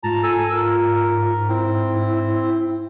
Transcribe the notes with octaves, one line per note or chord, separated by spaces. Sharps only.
G#2 F4 A5 A#5
A4 G#5 E6
F4 A#4
C4 E4